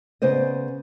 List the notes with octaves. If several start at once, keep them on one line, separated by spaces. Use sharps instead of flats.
C#3 B3 C5 D5 D#5